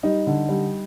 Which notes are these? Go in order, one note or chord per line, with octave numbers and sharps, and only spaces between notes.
G3 D#4
D3
G3